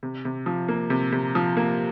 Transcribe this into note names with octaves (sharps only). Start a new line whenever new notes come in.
C3
C3
F3
A#3
C3
C3
F3
A#3